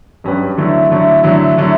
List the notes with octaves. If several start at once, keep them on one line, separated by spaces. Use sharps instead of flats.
G2 F#3 C#4 G4 B4
D3 F#3 A3 E4
D3 F#3 A3 E4
D3 F#3 A3 E4
D3 F#3 A3 E4